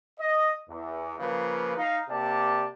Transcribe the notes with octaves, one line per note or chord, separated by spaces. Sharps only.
D#5
E2
C#3 F3 A#3 F4 B4
D#4 F5
C3 A#3 G4 D5 A5